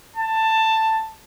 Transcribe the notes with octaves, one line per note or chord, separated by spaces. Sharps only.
A5